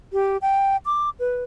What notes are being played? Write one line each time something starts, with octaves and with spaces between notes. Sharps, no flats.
G4
G5
D6
B4